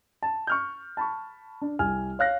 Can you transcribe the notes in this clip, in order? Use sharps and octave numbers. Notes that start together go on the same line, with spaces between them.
A5
C#6 F6 G6
A5 B5 C#6
D4
C2 G#5 F6
C#5 F5 F#6 A#6